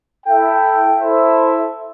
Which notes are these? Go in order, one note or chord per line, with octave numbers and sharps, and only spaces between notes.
E4 A4 E5 G5
E4 A4 C5 E5